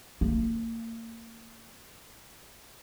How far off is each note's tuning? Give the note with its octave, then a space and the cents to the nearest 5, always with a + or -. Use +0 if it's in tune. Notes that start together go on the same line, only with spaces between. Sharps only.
A#3 -35